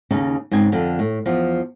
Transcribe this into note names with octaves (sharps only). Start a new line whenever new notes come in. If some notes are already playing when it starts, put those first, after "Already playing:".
D#2 C#3 C#4 D#4
G#2 C#3 C4 G#5
F2 D3
A2
E2 F3